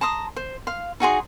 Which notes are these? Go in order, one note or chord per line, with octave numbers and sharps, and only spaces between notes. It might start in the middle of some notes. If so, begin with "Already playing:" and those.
A5 A#5 C6 D#6
C5
F5 C6
D#4 F#4 G#4 C6